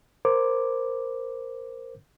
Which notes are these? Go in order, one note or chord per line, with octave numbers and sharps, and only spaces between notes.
A#4 C5 D6